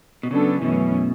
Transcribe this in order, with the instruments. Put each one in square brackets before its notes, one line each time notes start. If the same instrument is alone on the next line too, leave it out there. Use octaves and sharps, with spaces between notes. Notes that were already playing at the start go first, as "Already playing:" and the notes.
[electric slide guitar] B2
[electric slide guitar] C#3 [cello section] F#3 B3 D4 A4
[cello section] F#2 E3 A3 C#4 [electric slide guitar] B2